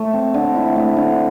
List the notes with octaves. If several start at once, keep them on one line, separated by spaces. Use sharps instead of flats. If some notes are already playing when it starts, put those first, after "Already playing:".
Already playing: A3
C4
D3
E4
A3
D3